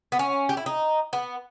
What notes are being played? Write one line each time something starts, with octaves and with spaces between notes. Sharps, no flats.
B3
C#4
G4
E4
D#4
B3